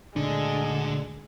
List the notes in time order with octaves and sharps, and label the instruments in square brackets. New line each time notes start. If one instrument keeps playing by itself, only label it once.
[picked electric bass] D2 A#2 D4 [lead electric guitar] D3 [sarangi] G#3